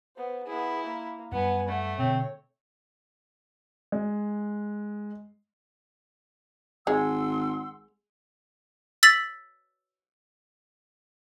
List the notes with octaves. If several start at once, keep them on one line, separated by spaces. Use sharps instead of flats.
B3 C5
B3 E4 G#4
A#3
F#2 G3 B3 F#5 G#5
A3 F#5
B2 D3 C4 C#5
G#3
G#1 G#3 F#5 C6 E6
E6 A6 B6 F#7